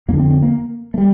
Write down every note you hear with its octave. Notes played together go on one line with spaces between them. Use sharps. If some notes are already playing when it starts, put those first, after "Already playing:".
F2 D3 A#3 D4
C4
C4
A#3
A3
G3